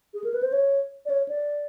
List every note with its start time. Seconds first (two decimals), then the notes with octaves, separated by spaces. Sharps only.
0.14 G#4
0.24 A#4
0.34 B4
0.43 C5
0.52 C#5
1.06 D5
1.10 C#5
1.29 D5